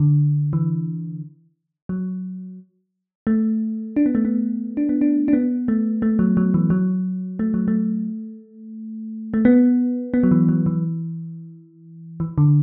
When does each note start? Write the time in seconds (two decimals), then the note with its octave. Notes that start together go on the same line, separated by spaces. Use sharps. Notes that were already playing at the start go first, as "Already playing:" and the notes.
Already playing: D3
0.53 E3
1.89 F#3
3.27 A3
3.96 D4
4.06 B3
4.15 A3
4.25 B3
4.77 D4
4.89 B3
5.01 D4
5.28 D4
5.33 B3
5.68 A3
6.02 A3
6.19 F#3
6.37 F#3
6.54 E3
6.70 F#3
7.39 A3
7.54 F#3
7.68 A3
9.34 A3
9.45 B3
10.14 B3
10.23 F#3
10.31 E3
10.49 F#3
10.66 E3
12.20 E3
12.38 D3